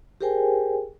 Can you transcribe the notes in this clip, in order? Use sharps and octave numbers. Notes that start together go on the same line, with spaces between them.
G4 G#4 A#4 C5 G5 G#5